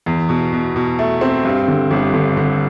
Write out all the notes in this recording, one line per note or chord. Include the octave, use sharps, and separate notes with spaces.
E2
B2
B2
B2
A3
C4
G2
D3
G1
D3
D3